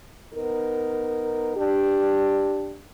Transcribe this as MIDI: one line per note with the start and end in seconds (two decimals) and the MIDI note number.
0.34 1.53 59
0.34 1.53 63
0.34 1.53 70
1.56 2.78 62
1.56 2.78 67